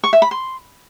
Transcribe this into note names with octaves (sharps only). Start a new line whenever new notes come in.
C#6
E5
B5
C6